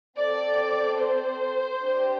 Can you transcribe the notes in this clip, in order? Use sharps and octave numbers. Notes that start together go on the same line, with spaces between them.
C4 A4 D5
C5
D4 G4